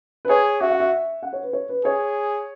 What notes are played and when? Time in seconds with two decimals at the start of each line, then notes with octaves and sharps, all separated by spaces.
0.25 B4
0.29 G#4 C#5
0.61 F#4 E5
0.70 F#5
0.80 E5
1.23 F#5
1.33 C#5
1.43 B4
1.53 C#5
1.69 B4
1.85 G#4 C#5